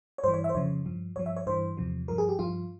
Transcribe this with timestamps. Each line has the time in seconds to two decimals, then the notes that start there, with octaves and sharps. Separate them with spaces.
0.18 C#5
0.24 G2 E3 C5
0.34 C#5
0.44 E5
0.49 C5
0.54 F2 C#3 F3 C#5
0.86 G2 F3
1.16 G2 F3 C#5
1.26 E5
1.37 C#5
1.47 G2 E3 C5
1.77 E2 C3 F3
2.08 G2 F3 A#4
2.18 G#4
2.29 G4
2.39 G2 F3 F4